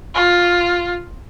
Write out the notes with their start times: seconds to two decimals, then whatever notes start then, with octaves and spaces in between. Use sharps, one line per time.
0.14 F4